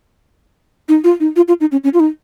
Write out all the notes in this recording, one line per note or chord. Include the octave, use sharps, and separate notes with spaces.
D#4
F4
D#4
F4
F4
D#4
C#4
C#4
F4
D#4